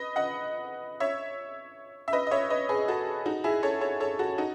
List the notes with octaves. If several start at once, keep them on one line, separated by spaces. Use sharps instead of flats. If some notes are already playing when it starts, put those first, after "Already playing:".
Already playing: B4 D#5
D#5 F#5
C#5 E5
E5
B4 D#5
D#5
C#5 E5
B4 D#5
G#4 B4
F#4 A4
D#4 F#4
E4 G#4
A4 C#5
A4 C#5
A4 C#5
F#4 A4
D#4 F#4